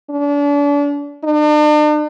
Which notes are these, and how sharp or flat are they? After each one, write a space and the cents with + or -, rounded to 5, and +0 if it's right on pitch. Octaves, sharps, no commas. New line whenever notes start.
D4 -35
D4 +45